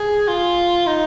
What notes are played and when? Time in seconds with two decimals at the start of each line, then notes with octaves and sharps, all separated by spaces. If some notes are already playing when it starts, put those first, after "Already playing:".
Already playing: G#4
0.28 F4
0.87 D#4